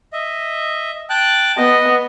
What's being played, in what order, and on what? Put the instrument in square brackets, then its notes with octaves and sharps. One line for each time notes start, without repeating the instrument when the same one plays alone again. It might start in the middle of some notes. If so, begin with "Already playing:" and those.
[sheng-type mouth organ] D#5 E5
G5 A5 F#6
[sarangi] B3 [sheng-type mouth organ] D#5